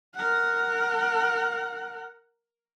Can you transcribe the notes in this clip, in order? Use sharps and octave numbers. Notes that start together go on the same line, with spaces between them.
A#4 F#5